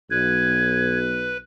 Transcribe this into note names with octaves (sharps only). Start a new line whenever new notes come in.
B1 B4 G#6